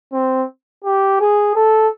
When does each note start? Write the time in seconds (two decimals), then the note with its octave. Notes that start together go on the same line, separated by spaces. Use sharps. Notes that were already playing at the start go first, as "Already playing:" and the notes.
0.13 C4
0.84 G4
1.20 G#4
1.56 A4